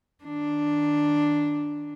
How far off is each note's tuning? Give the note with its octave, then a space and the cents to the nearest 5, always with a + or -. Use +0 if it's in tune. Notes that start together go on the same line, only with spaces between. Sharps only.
D#3 +0 D4 +0